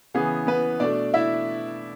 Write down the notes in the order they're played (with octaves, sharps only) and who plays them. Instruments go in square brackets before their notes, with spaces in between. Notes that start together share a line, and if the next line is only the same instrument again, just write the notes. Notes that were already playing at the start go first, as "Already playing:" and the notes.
[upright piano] C#3 E3 B3 G#4
B3 B4
B2 A3 D4 D5
E4 E5